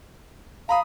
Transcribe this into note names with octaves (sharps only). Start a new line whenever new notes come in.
F5 A#5 B5 D#6